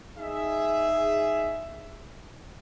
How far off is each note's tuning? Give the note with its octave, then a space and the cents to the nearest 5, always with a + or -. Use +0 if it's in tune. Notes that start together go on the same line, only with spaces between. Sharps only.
D#4 +0 G#4 +0 E5 +10